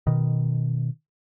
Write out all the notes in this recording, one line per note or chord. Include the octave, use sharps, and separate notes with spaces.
B2 D#3